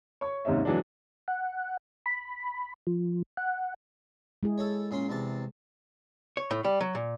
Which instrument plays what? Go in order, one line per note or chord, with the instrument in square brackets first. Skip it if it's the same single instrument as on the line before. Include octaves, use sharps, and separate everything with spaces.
[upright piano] C#5 C#6
D#2 G#2 C3 C#4 D#4 E5
E3 F#3 G#3 B3 D4
[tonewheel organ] F#5
B5
F3
F#5
[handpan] G#3 E4 G#4
[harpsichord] A4 C#5
A#2 C#4 C6
E2 C3 A5
[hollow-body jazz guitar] C#5
A2
G3
F#3
A#2